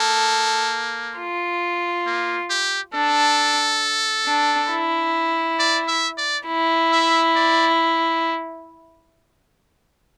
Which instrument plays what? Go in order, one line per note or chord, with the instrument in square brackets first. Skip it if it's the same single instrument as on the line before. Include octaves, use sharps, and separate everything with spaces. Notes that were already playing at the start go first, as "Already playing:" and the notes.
Already playing: [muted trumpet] A#3 [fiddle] A4
[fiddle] F4
[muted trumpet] A#3
G4
[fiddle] D4 [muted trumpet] A4
[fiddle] D4
E4
[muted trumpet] D5
E5
D5
[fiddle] E4
[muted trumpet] E5
D5